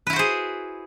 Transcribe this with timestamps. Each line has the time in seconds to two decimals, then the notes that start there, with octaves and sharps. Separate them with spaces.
0.07 B4
0.10 E4
0.13 F#4
0.16 C5
0.19 G#4